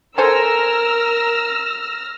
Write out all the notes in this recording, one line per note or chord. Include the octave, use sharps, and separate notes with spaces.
A4 A#4 C5 G#5 E6 F6 A#6